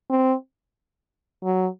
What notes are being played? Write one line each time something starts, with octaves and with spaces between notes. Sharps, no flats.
C4
F#3